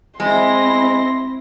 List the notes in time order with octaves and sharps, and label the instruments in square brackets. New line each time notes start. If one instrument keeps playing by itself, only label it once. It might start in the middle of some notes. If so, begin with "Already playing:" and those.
[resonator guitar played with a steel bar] G#3 [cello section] C4 [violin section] E4 A#6 [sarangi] C6